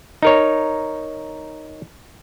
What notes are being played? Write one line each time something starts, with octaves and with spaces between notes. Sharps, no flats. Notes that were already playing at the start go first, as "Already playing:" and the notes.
D#4 A#4 C#5